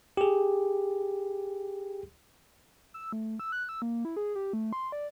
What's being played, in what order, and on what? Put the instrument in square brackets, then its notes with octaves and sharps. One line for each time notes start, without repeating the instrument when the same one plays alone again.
[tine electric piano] G4 G#4
[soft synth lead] E6
A3
E6
F#6
E6
A#3
E4
G#4
G4
A3
C6
D5